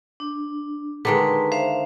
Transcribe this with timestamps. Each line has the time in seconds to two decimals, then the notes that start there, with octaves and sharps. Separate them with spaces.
0.20 D4
1.05 D3 D#3 G#3 B4
1.52 C5 E5 F5